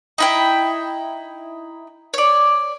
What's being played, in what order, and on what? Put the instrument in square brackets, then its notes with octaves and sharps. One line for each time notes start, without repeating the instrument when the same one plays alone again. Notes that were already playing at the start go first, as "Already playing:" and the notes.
[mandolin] D#4 E4 G5
C#5 D5